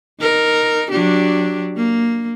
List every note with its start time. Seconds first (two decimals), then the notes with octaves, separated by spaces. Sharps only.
0.20 D#4 A#4
0.90 F#3 D4 G4
1.77 A#3